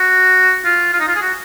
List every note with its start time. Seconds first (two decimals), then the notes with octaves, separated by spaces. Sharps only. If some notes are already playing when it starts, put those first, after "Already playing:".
Already playing: F#4
0.65 F4
0.93 F4
1.00 D#4
1.08 F4
1.16 G#4
1.22 F#4